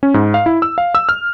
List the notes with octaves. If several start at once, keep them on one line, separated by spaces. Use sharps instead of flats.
C#4
G#2
F5
E4
E6
F5
E6
F6